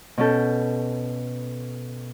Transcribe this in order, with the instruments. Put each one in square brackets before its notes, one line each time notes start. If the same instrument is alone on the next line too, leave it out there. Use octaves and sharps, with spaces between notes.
[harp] B2 C#4 A4 G6